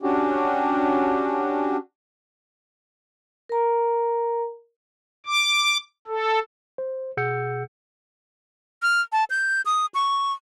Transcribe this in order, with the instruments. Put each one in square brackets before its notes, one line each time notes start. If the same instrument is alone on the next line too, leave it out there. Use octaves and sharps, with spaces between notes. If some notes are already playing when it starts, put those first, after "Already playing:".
[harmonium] C#4 D4 F#4 G4
[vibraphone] A#4 A#5
[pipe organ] D6
A4
[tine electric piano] C5
B2 G#4 F#5 E6 G6 C#7
[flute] F6
A5
G6
D#6
C#6